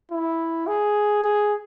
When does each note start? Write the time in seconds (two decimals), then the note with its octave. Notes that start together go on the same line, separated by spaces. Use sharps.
0.11 E4
0.67 G#4
1.24 G#4